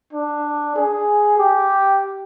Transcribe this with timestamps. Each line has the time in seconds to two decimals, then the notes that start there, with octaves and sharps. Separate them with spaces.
0.13 D4
0.76 G#4
1.38 G4